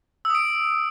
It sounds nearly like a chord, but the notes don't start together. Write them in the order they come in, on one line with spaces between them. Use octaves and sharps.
E6 D#6 D7